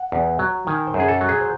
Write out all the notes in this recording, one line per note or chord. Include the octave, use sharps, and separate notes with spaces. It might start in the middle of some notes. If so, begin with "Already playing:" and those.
Already playing: F#5
E2
F#3
D#3 G#5
C5
F#2
G#4
A4
F#3
G#4
C5